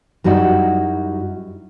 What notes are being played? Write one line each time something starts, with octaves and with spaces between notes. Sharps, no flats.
F#2 G3 D#4 E4 F#4